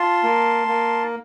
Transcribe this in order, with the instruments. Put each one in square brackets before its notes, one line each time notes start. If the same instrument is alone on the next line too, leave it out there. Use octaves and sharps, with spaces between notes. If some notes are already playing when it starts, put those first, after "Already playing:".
Already playing: [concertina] F4 A5 C6
A#3
A#3